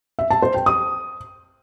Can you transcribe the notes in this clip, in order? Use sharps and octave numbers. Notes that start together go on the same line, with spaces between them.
E5
A5
C5
G5
D#6